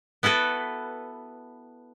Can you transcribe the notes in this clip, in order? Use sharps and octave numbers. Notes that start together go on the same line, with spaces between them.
B3 E4 F#4 A4 B4